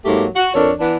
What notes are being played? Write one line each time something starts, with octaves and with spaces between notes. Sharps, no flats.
G#2 F#3 A3 A#3 G4
F#4
F2 D4 A4 A#4 C#5
E3 B3 D4